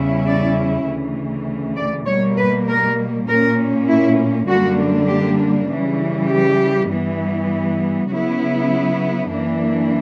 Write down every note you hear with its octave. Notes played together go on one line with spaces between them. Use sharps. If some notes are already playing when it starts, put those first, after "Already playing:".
Already playing: E2 C#3 G3 C#4 E4
D5
D2 C#3 E3
D5
B2 G3 A#3 C#5
B4
A#4
A#2 A#3 C#4 A#4
E4
F#2 D3 G3 A#3 D4 F#4
G4
C#3 E3 G3
G4
G2 E3 G3 B3
C#3 F#3 B3 E4 F#4
F#2 E3 A#3 D4